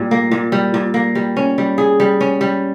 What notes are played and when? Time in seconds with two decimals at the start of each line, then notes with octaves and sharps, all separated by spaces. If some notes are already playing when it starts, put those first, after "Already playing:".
Already playing: A#2 G3
0.11 A#3
0.31 A#2
0.52 G3
0.74 A#2
0.94 A#3
1.15 G3
1.37 C#4
1.58 G3
1.78 G#4
2.00 G3
2.21 C#4
2.41 G3